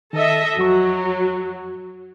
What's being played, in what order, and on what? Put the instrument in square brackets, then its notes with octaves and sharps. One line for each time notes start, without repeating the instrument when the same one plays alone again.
[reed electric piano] D#3 [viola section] A4 D#5 E5
[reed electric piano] F2 F#4 C#6 [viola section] F#3